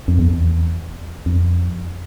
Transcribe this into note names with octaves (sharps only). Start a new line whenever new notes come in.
F2
E2
F2